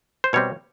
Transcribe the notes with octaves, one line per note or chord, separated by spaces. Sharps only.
C5
B2 G3 C4 C#5